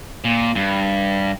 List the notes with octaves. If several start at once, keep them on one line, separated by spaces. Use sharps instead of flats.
A#2
G2